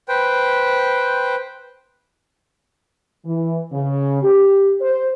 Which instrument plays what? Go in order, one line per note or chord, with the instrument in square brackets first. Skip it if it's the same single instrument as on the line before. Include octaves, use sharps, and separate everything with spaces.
[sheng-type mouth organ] B4 C5 G5
[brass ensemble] E3
C#3
G4
C5